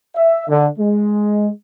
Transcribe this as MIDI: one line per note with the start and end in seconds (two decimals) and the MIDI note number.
0.15 0.46 76
0.48 0.67 50
0.78 1.48 56